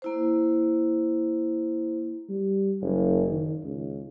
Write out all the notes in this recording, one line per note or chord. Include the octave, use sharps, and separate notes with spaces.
A#3 E4 C5
G3
F#1
D#3
C#2